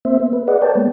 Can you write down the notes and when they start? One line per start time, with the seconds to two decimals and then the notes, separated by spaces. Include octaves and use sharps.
0.05 A#3 C4 C5 E5
0.20 B3
0.33 B4
0.48 G#4 B4 D5 D#5 F#5
0.62 A#4 B4 C#5 D5 G5 A5
0.75 G#3 A#3 B3